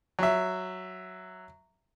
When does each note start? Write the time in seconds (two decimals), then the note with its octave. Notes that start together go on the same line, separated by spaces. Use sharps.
0.19 F#3 E5